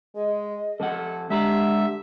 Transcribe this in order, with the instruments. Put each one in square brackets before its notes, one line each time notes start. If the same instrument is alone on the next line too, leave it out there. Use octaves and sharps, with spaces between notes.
[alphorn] G#3 [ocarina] D#5
[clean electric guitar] F2 F3 F#5 [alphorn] A4
[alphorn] D3 [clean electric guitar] G#3 A#5 B5 [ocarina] G4 [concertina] E5